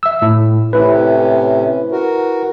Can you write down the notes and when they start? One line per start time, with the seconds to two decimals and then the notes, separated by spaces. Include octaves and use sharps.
0.03 E5 E6
0.22 A2
0.73 A2 C3 C#4 E4 B4
1.92 F#4 A#4